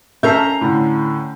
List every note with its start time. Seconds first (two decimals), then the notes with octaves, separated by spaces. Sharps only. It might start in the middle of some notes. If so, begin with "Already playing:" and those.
0.23 C#4 A4 A#4 E5 A#5 G6 C7
0.61 A2 D3